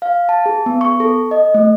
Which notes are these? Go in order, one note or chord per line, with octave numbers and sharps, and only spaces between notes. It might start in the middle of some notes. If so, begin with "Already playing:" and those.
F5
A5
G#4
B3
C#6
A4
D#5
A3